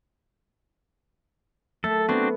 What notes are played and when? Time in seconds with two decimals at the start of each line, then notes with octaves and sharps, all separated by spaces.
1.84 A3 A4
2.09 B3 C4 D4 F#4